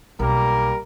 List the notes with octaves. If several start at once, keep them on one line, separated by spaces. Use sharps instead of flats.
B1 G3 A#3 A#4